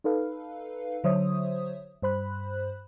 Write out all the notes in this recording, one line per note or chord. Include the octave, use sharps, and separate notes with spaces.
D#4 A4 B4 F5
D3 F#3 C5 C#5 E5 D#6
G2 C5 B5 F#6